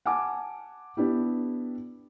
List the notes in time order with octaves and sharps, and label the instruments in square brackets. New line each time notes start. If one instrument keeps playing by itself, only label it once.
[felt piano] F#5 G#5 A5 D6
B3 D4 E4 G4